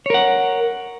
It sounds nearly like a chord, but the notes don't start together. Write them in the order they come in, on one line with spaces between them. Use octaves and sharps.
C#5 A#4 F#5